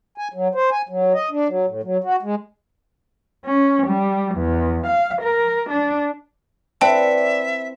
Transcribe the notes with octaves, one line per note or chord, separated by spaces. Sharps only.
G#5
F#3
C5
G#5
F#3
D#5
D4
F#3
A2
F#3
F#4
G#3
C#4
G3
E2
F5
A#4
D4
C4 E4 B4 D5 E5 F#5 G5 A5